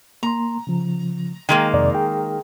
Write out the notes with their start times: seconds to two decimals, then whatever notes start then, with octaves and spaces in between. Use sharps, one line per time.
0.23 A#3 A#5 C6
0.67 C#3 F3
1.49 D#3 G#3 A#3 G5
1.74 F2 C3 D5
1.95 G#4 G5